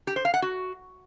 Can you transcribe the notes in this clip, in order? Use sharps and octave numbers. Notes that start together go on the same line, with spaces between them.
G4
C5
F5
F#5
F#4